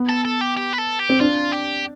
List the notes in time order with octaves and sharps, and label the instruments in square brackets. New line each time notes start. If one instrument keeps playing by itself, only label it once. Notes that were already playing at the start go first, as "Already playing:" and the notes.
Already playing: [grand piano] B3
[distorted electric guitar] A4
A4
G4
G4
B4
A4
G4
[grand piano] C4
[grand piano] D4 [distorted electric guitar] F4
[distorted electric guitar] G4